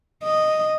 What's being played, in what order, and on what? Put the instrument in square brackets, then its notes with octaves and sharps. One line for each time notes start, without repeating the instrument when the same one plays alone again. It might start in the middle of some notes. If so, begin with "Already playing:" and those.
[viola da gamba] D#5